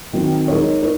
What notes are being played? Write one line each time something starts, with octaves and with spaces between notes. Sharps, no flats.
D#3 F#3 C4
G#3 D#4 A#4 C#5
D#4 A#4 C#5